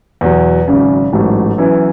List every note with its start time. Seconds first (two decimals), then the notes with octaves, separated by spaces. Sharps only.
0.21 E2 B2 F#3
0.68 G#1 F#2 C#3
1.13 A1 G#2 F#3 A3
1.58 F#2 E3 B3 E4